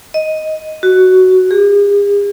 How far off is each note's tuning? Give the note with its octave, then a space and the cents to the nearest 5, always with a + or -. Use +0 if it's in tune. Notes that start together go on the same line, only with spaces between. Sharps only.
D#5 +5
F#4 +10
G#4 -45